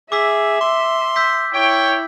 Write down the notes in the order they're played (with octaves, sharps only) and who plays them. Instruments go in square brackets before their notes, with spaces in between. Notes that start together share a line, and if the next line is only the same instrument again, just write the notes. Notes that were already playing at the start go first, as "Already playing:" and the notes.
[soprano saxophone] G#4 [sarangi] E5 [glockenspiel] D6 E6 B6
[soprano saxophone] C6 [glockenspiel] D6
[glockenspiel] E6 G6 B6
[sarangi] E4 [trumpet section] C#5 G5